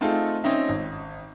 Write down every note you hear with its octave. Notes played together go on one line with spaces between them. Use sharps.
A3 C4 D#4 F4 G#4 A4
C4 C#4 D#4 E5
G#1